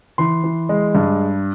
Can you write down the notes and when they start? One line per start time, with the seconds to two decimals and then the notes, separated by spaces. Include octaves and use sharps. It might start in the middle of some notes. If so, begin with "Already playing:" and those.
0.18 E3 C6
0.44 E3
0.69 G#3
0.95 G2